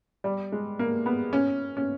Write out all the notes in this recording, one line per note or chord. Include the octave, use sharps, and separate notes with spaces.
G3
G#3
A#3
B3
C#4
C#4